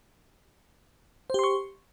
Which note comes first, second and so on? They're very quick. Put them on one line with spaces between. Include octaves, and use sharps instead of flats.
C5 G4 C6 C#6